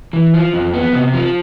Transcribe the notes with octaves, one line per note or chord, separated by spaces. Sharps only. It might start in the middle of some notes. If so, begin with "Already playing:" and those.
E3
F3
F2
B3
C3
F3